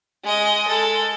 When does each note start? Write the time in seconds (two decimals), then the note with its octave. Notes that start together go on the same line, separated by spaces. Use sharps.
0.23 G#3 D#5
0.68 G#3 A4